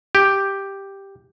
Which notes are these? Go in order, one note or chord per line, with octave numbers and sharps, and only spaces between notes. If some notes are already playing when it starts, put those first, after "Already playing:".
G4